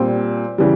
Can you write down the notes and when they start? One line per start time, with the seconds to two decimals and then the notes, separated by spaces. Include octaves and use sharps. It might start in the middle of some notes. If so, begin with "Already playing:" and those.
Already playing: A#2 G3 C4
0.58 C#3 E3 G3